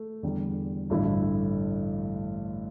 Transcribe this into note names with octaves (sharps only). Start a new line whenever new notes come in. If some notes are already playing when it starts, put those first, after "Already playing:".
Already playing: A3
E2 D3 G3
A1 G2 D3 A3 E4